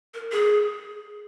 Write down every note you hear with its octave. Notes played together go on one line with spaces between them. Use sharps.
A#4
G#4